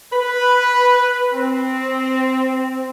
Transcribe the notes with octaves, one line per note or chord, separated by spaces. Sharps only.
B4
C4